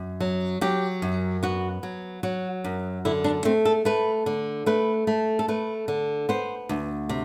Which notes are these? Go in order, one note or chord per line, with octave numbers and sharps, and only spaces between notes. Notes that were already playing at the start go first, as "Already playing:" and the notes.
Already playing: F#2
F#3
F#3 G4
F#2
B3 F#4
F#3
F#3 F#4
F#2
D3 E4
D4
A3 C4
A4
A3 B4
D3
A3 B4
A3
A4
A3 B4
D3
B3 C5
D2
C3